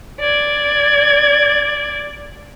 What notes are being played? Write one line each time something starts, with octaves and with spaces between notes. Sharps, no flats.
D5 G#6